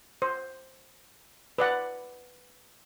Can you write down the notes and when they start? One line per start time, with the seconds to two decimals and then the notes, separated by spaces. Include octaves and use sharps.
0.22 C5
1.58 B4 D5 F#5